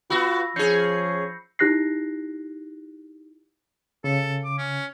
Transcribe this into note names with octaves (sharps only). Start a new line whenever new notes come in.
B3 F4 F#4 B5 E6 A#6
F3 C#4 G#4 G6 C7 C#7
D#4 E4 G4 F#6 A#6 C7
C#3 A4
D6
C#4